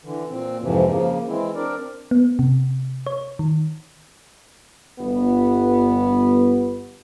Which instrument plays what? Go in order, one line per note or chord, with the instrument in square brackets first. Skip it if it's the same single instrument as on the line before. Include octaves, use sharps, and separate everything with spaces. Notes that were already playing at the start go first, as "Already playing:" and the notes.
[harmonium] D3 E3
A#2 C4
F2 G#2 C3 E3 F3
C#3 F3 A#3
E3 G#3 C4 E4
C4 D4 A#4 D5
[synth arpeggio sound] B3
C3
C#5
D#3
[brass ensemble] G1 B3